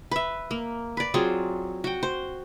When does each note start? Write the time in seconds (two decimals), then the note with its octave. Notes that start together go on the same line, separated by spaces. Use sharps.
0.11 B4 E5
0.51 A#3
0.97 B4 D5
1.14 F#3 C4 F4 G#4
1.84 F#4 G5
2.03 C5